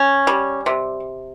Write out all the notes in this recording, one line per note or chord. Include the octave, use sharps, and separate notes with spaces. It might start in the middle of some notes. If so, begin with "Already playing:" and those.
Already playing: C#4
G3
C3